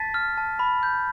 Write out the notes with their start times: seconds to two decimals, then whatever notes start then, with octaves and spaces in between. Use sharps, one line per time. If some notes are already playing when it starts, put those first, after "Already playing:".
Already playing: A5 A6 B6
0.14 F6
0.37 A5
0.59 B5
0.83 G6